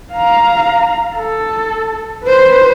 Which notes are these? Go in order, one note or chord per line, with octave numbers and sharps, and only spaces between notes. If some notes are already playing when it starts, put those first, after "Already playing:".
F5 A#5
A4
B4 C5